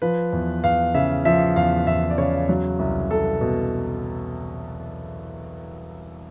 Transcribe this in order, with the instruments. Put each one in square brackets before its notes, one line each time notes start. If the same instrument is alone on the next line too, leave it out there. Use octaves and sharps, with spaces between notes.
[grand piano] F3 B4
E2
E2 F5
C#3 E5
F3 E5
E2 F5
E2 E5
D5
C#3 C#5
F#3
C2
C2 A4
B2